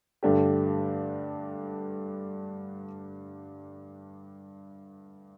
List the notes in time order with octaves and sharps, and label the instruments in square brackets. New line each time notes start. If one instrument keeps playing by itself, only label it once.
[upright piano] G2 D3 A3 D4 G4